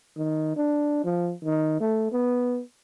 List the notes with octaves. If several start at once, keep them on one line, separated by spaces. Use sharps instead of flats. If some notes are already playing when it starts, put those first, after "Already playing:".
D#3
D4
F3
D#3
A3
B3